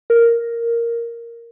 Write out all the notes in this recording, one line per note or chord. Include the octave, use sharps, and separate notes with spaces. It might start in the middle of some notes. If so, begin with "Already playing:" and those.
A#4